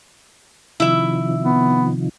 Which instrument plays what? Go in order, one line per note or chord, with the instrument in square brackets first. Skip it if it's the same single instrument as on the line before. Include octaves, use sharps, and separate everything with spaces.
[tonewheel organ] C3 D#3 F3 [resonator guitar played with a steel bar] E4 E5
[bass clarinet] B3